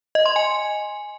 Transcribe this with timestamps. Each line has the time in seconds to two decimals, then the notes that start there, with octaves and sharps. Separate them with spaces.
0.15 D#5
0.26 C6
0.36 G#5